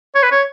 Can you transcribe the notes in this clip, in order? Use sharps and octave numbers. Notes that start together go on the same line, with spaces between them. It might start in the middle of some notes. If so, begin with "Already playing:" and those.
C#5
B4
C#5